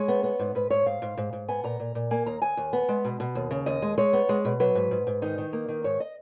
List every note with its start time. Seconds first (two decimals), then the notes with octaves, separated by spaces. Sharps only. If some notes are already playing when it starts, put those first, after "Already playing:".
Already playing: G#3 C#5
0.08 B3
0.24 B3
0.39 G#2
0.55 G#2 B4
0.70 G#2 C#5
0.86 G#2 F5
1.02 G#2
1.17 G#2
1.33 G#2
1.48 B3 G#5
1.64 A#2 A#5
1.80 A#2
1.95 A#2
2.11 A#3 G#5
2.26 D#2 A#5
2.42 D#2 G#5
2.57 D#2
2.73 B3
2.89 G#3
3.05 B2
3.20 B2
3.35 D#2
3.51 C#3
3.66 D#2 D#5
3.82 G#3
3.98 G#3 C#5
4.13 B3
4.29 G#3
4.45 B2
4.60 F#3 B4
4.75 G#2
4.91 G#2
5.07 G#2
5.22 D#3 D#4
5.38 D#3
5.53 A#3
5.69 D#3
5.84 G#2 C#5
6.00 D#5